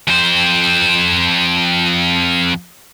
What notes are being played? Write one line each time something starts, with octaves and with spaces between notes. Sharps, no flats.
F2 C5